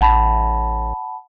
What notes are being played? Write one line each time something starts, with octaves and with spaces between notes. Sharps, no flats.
A1 F#5 A5 B5